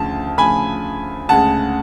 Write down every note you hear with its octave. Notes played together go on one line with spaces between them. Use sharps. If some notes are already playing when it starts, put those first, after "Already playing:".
Already playing: D2 C#3 F3 A5
D2 C#3 F3 G#5 B5
D2 C#3 G#3 F#5 A5